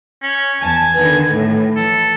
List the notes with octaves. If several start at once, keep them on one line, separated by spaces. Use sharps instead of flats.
C#4
E2 G#5 A5
D3 D#3 B3
A2
E3 A4